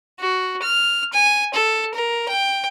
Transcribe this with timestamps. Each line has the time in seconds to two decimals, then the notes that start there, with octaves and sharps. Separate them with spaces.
0.19 F#4
0.62 F6
1.13 G#5
1.54 A4
1.94 A#4
2.29 G5